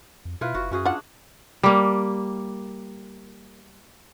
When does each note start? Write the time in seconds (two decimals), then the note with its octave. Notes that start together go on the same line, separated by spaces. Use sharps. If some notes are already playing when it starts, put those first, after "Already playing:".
0.25 F2
0.41 B2 E4 F4 B4
0.55 F#1 F#4
0.71 F#2 C#4 F#4 G#4
0.85 D4 F4 F#5
1.63 G3 A#3